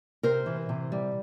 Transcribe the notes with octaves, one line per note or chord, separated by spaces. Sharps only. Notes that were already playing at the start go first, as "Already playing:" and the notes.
C3 A#4 C5
E3
C3
G3